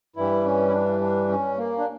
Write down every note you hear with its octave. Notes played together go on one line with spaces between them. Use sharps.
G2 E3 G3 E4
C#4
E4
D4
D4
C#4
A#3
D4